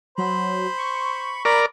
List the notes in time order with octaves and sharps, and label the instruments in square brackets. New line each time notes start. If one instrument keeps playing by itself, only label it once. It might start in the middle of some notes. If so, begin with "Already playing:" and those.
[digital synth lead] F#3 [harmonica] C5 B5
[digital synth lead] C#6
[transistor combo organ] A#4 D5 [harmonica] A#5 B5